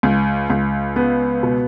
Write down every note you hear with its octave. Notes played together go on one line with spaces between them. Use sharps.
C#2
C#2
B3
B2